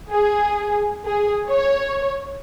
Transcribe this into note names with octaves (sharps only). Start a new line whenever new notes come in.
G#4
G#4
C#5